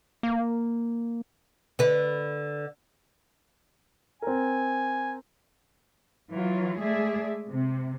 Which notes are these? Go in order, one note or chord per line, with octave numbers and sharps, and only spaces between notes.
A#3
D3 B4
C4 A#4 G#5
E3 F#3 F4
G#3 A3 G#4 D5 E5
C3